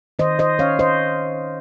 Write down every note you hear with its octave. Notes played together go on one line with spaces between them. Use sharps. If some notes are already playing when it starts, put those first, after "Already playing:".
D#3 C5 D#5
C5 D#5
C#4 C#5 F5
C5 D#5